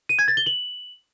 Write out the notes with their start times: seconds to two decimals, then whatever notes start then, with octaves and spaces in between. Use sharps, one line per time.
0.09 D#7
0.19 G#6
0.28 A6
0.37 G7
0.46 F#7